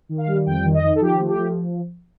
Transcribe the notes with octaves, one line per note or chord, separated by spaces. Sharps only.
D#3
F5
G3
F2 G5
D#3
D#5
D#3
A4
F3 G4
A3
G4
F3